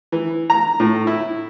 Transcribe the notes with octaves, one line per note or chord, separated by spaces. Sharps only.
E3
A#5
A2
E4